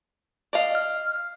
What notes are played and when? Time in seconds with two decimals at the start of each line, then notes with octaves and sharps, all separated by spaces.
0.53 D5 D#5 F5
0.75 F6